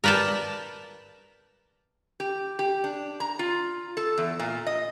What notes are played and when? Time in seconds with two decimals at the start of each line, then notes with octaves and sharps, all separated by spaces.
0.04 A#4 B4 D5 G5 A5
2.20 G4
2.59 G4
2.84 D4
3.20 A#5
3.39 F4
3.97 A4
4.18 E2
4.39 A#2
4.67 D#5